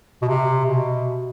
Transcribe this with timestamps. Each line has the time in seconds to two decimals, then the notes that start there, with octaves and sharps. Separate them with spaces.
0.22 B2
0.28 C3
0.66 B2